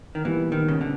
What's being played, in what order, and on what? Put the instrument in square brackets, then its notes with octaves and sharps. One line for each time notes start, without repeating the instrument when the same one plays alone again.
[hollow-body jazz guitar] D#3
[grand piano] A#2 G3 B3 [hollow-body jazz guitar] E3
[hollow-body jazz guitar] D#3
C#3
D3